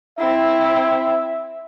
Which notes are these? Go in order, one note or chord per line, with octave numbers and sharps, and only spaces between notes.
C4 E4 E5